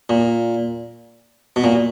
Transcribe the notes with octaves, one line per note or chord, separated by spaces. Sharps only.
A#2
B2
A#2